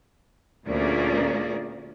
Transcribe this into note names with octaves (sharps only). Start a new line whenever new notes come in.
D2 A#2 A#3 C#4 G#4 D5